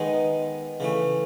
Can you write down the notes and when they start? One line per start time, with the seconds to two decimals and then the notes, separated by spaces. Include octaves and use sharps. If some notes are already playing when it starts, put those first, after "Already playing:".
Already playing: D#3 G#3 B3 D#4 G#4
0.80 C#3 E3 A3